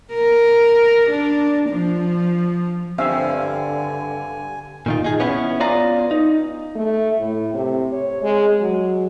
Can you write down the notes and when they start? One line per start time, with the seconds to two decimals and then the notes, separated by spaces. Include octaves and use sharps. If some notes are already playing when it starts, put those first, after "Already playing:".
0.14 A#4
1.10 D4
1.70 F3
2.98 G2 D3 C4 E5 F5 G#5
4.86 A#2 D#3 F4
5.04 D#4 G#4
5.20 B3 C#4 E4
5.60 B3 F4 D5 F5 G#5 A#5
6.11 D#4
6.76 A3
7.19 A2
7.54 C3
7.93 C#5
8.22 G#3
8.60 F#3